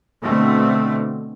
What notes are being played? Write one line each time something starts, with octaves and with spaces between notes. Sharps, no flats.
B2 D3 A3 C4